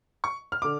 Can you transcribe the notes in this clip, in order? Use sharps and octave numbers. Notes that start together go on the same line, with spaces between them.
C#6
F6
D3 D6